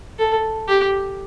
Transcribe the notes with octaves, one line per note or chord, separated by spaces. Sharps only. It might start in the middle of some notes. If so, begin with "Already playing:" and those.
A4
G4